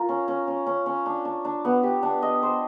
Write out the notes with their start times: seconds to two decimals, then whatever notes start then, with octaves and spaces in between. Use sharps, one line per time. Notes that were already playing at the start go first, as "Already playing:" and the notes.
Already playing: F4 A#4
0.09 C#4
0.28 C#4
0.47 C#4
0.66 C#4
0.86 C#4
1.06 D4
1.25 D4
1.45 D4
1.65 B3
1.83 G4
2.03 D4
2.22 D#5
2.43 C5